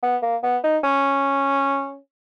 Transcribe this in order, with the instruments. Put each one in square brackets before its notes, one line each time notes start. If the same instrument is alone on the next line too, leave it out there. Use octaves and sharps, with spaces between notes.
[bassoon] B3
A#3
B3
D#4
C#4